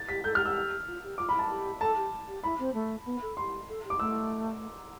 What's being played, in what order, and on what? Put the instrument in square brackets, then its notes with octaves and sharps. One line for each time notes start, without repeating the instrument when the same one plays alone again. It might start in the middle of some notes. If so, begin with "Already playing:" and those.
Already playing: [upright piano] A6
[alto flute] G4 [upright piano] B6
[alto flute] A4 [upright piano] G6
[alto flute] G4 [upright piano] F6
[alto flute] G4 [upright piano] E6
[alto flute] F4
G4
[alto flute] F4 [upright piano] D6
[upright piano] B5
[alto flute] E4 [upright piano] A5
[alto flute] G4
[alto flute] A4 [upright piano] A5
[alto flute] G4
G4
[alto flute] E4 [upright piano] B5
[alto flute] C4
A3
B3
A4
[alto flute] G4 [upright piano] C6
[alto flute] A4
G4
[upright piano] D6
[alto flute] A3 [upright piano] E6